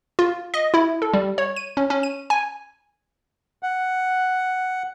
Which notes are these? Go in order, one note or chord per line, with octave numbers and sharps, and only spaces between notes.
F4
D#5
E4
A4
G3
C#5
D#7
C#4
C#4
D#7
G#5
F#5